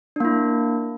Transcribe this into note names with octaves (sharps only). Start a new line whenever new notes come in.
A#3 D4 E4